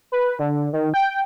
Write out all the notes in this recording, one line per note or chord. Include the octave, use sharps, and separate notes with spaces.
B4
D3
D#3
G5